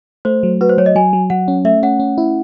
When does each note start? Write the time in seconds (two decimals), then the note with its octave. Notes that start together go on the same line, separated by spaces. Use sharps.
0.25 A3 C5
0.43 F#3
0.61 F#4 B4
0.69 C5
0.78 F#3 C#5
0.86 D#5
0.95 F#3 G#5
1.13 F#3
1.30 F#3 F#5
1.48 C#4
1.65 A3 E5
1.83 C#4 F#5
2.00 C#4
2.18 E4